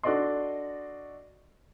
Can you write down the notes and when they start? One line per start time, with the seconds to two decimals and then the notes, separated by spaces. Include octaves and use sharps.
0.03 D4 F#4 A4 D5 D#5 C6